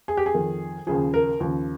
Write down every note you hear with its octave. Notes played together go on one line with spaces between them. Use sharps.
G#4
G4
G#4
F2 D#3
D#2 C#3 F3 G#4
A#4
D#2 C#3 F3